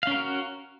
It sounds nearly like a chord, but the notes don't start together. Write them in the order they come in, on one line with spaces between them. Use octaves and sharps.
F5 C#4 A#4 F#4